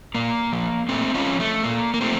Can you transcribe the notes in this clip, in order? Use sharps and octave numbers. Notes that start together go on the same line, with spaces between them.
A#2 A#3
F3
A#2 A3 C4
C#4 F4
F3
A3
A#2 A#3
A#3
F3 A3 C4